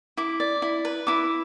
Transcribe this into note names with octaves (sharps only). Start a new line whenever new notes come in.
E4 D6
D5
E4
B4
E4 D6